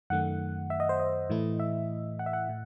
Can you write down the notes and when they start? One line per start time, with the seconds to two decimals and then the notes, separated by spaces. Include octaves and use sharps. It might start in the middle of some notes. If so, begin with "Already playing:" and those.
0.10 F#2 D#3 A3 F#5
0.70 E5
0.80 D#5
0.89 C5
1.00 D#5
1.30 A2 E3 A3 E4
1.59 E5
2.19 F#5
2.26 E5
2.33 F#5
2.49 A2